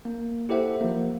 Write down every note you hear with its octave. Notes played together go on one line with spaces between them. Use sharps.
A#3
E4 G4 A4 C5 E5 F#5
F3 A#3